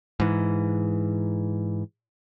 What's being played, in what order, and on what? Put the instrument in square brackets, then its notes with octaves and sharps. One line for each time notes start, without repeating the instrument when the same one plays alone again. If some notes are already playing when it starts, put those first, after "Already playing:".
[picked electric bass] G#2 E3